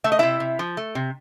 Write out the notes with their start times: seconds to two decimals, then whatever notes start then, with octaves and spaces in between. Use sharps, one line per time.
0.04 A3 E5
0.12 D#5
0.19 C3 E4 E5
0.40 C3
0.59 F3
0.77 A3
0.95 C3